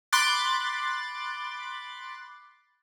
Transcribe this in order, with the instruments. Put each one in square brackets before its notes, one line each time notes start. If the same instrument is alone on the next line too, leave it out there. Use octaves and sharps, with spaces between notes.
[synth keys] B5 C6 D6 F#6 A6